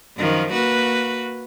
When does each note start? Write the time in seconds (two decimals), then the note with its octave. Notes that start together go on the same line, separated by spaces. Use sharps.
0.17 F#2 D#3 F3
0.53 A#3 F#4 B4